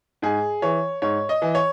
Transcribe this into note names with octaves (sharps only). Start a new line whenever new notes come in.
G#2 G#4
E3 C#5
G#2 C#5
D#5
E3
C#5